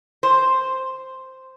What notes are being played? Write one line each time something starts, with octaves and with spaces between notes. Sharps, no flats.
C5